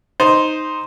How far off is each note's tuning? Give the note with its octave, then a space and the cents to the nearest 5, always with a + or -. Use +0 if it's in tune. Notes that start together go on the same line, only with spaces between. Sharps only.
D#4 +0 C5 +0